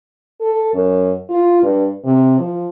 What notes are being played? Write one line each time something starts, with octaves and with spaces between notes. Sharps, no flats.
A4
F#2
F4
G2
C3
F3